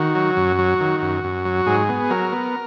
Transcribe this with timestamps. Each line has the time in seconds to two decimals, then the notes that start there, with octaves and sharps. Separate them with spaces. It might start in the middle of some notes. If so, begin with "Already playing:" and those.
Already playing: D#3 F#4
0.15 F#3
0.37 F#2
0.59 F#3
0.80 D#3
1.02 F#2
1.24 F#2
1.45 F#3
1.67 G#2 G#4
1.89 B3
2.10 F#3 A#4
2.32 B3